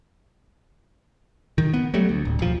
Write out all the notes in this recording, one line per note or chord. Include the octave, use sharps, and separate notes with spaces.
D#3
B3
F#3 G3 A3
D2
D1
D#1 F3